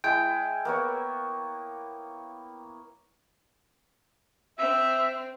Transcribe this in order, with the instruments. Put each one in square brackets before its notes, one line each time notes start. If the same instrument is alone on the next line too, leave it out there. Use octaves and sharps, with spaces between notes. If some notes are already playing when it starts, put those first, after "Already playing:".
[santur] G#3 E4 [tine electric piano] G5
[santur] A#3 B3 C#5
[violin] C4 [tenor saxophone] E5